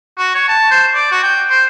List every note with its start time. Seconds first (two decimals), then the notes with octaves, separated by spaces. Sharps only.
0.18 F#4
0.34 C#5
0.48 A5
0.71 C5
0.94 D5
1.12 F#4
1.23 G5
1.50 C5